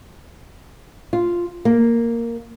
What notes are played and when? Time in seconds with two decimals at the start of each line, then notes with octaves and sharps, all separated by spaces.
1.13 F4
1.65 A#3